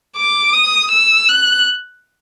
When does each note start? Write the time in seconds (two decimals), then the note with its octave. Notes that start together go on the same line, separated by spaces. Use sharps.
0.16 D6
0.53 D#6
0.91 E6
1.28 F#6